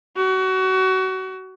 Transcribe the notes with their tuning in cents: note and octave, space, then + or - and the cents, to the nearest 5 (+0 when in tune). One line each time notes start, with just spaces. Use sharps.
F#4 +25